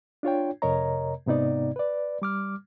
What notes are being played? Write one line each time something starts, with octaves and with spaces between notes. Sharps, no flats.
D4 F4 C#5 G5
F2 C3 A#4 C#5 D#5 A#5
G#2 C3 B3 D#4 D5
B4 D5
G3 D6 F6